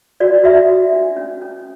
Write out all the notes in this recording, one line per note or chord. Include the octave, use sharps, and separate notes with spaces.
F#4 D5
F#4 E5
F#4
D4
C#4
C#4